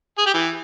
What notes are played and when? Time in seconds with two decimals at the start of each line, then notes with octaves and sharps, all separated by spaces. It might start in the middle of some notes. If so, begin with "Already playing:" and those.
0.18 G#4
0.26 G4
0.34 E3